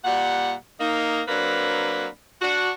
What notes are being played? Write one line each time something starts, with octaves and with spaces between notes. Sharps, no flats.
A#2 G3 F#5
A#3 D#4
F#3 A#3 C4 D4 B4
D4 F#4